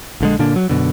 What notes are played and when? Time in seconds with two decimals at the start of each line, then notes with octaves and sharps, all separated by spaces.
0.21 A#1 D3 G#3
0.39 A#2 D3 A#3 D4
0.56 F#3
0.69 F#2 B2 D3